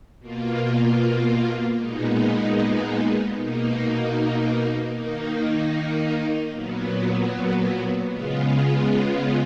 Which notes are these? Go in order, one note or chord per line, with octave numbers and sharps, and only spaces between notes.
B2 A#3 F4
A#2 G#3 B3 D#4
B2 A#3 D#4
D#3 A#3 D#4
A#2 F#3 B3
C#3 G#3 B3 F4